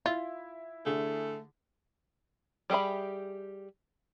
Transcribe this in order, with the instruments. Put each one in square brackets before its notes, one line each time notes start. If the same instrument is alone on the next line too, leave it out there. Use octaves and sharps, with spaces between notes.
[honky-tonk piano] E4 [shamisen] F4
[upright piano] D3 G#4 [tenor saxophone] A3
[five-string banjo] G3 G4 G#4 E5 B5